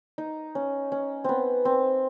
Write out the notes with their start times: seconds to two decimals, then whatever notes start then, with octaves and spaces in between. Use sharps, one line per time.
0.18 D#4
0.55 C#4
0.92 C#4
1.24 B3 C4
1.65 C4